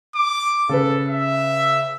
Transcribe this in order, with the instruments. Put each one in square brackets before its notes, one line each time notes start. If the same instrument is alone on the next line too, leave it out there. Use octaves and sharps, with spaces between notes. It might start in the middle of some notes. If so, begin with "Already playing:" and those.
[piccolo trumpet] D6
[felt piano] C#3 B4 [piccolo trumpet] A4
[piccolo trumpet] E5